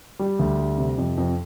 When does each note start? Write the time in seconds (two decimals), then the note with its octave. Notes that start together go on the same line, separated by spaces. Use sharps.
0.19 G3
0.39 D2
0.58 G3
0.78 C3
0.98 F2
1.17 F2